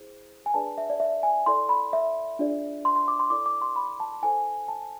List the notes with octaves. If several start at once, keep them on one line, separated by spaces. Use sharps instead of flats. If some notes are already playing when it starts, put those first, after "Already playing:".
Already playing: E4 G#4 C5
G#5
D4 G#4 B4 D5 A5
E5
D5
E5
G#5
E4 A4 D5 C6
B5
E5
D4 F4 G#4 D5
C6
C6
D6
C6
E4 A4 D5 D6
D6
C6
B5
A5
E4 A4 C5 G#5
A5